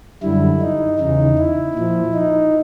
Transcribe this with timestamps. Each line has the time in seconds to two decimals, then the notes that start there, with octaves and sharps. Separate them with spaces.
0.23 F#2 D3 G3 E4
0.61 D#4
0.99 E2 C#3 E3 D#4
1.38 E4
1.75 A#2 F3
2.14 D#4